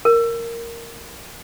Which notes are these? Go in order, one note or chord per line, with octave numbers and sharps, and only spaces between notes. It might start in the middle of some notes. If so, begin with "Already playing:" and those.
A#4